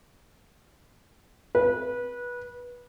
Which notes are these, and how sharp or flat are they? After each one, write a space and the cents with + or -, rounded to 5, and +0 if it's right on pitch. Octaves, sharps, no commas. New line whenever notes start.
B4 -20